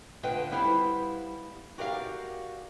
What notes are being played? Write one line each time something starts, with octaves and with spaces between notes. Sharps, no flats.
D3 F4 B4 D#5 F#5 G5
G3 B3 E4 C5 F5
F#4 G4 A#4 D5 E5 F5